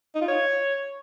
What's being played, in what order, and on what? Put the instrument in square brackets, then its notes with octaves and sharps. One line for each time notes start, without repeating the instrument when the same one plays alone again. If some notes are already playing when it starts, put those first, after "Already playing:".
[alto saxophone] D#4
F4
C#5